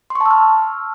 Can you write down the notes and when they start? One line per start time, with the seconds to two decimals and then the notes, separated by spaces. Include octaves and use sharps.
0.10 C6
0.15 C#6
0.21 A5
0.26 E6
0.31 F6